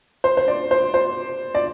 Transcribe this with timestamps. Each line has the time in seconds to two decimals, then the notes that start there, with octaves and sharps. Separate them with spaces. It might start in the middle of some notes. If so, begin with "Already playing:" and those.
0.24 C5
0.37 C5
0.48 D5
0.71 C5
0.94 C5
1.55 D5